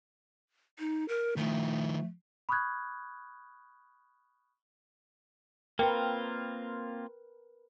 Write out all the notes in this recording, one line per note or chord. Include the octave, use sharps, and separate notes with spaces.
D#4
A#4
D#3 F3 A3
B5 C#6 D#6 F6 F#6 G#6
A#3 C4 F4 A#4 B4 G5